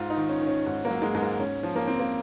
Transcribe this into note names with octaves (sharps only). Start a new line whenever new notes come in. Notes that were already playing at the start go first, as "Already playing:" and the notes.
Already playing: G#2 F4
D#4
D#3
C#4
D#3
C#4
G#2
A#3
F#3
G#3
G#2 G#3
A#3
G#2 C#4
F3
A#3
F3 C4
A#3